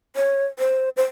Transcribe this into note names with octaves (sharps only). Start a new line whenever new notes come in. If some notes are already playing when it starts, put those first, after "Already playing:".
C#5
C5
C5